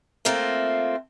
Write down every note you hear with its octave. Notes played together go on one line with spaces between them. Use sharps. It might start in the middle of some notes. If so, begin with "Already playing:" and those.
A3 A#3 C4 F4